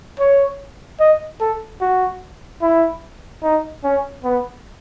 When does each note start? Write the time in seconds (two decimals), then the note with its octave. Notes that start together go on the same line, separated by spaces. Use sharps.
0.20 C#5
1.00 D#5
1.40 A4
1.81 F#4
2.62 E4
3.43 D#4
3.84 C#4
4.24 B3